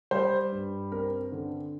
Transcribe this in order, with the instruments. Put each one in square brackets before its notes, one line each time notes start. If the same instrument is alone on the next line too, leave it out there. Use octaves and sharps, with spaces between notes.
[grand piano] G3 C5
G2
C4 A#4
D3